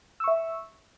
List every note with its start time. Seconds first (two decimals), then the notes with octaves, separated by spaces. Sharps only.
0.20 E6
0.24 C#6
0.28 E5